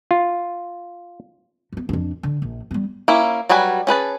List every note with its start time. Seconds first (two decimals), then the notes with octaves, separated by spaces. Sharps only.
0.11 F4
1.72 F3 B3
1.89 F2 D4
2.23 D3
2.42 A#1
2.71 G3 B3
3.08 A#3 C#4 E4
3.49 F#3 G3 F#4 B4 G#5
3.87 C#4 G#4 B4 A5